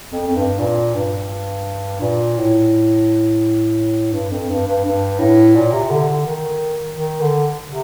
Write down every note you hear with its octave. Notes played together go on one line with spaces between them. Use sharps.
F2
F2
G2
A#2
G2
A#2
A2
G2
F2
G2
G2
G2
A2
A#2
C3
D3
D3
D#3
D#3
D3
C3